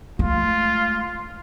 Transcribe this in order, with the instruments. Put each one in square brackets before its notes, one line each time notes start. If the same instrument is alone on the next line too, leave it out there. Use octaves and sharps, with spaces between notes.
[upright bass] G#3 A3 [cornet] F4